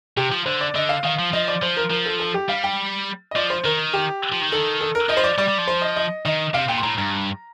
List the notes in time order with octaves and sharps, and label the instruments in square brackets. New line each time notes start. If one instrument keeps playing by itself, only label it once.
[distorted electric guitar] C3 [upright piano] G4
[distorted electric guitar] F3
[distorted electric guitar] D3 [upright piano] C5
[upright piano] D5
[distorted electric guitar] D3 [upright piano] D#5
[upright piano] F5
[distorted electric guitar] D#3 [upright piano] F5
[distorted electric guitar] F3
[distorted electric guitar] F3 [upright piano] D#5
[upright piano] D5
[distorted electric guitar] F3 [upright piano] C5
[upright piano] A#4
[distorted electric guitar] F3 [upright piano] A#4
[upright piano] A4
A4
G4
[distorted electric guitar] G3 [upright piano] F5
[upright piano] G5
D#5
[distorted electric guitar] F3 [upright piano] D5
[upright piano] C5
[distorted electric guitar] D#3 [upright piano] A#4
[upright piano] G4
[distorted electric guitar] F3
D#3
[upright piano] A4
A4
A#4
[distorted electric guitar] F3 [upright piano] D#5
[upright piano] C5
D5
[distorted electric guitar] G3 [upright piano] D5
[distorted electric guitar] G3
F3
[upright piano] C5
D#5
D#5
[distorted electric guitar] D#3 [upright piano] D#5
[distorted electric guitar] C3 [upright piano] F5
[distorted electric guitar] A#2 [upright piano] G5
[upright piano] C6
[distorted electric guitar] A2 [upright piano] A#5
[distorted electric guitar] G2 [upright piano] A#5